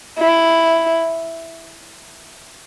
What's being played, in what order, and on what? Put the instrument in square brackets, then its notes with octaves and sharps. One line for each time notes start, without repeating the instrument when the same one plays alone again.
[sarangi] E4